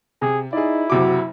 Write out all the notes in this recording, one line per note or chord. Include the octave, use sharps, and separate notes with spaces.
C3 G#4
D#4 E4 G#4 D5
F#1 C3 F#4 D6